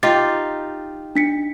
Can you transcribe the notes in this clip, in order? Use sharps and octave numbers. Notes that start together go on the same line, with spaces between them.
D#4 F4 G4 A6
D4 B6 C#7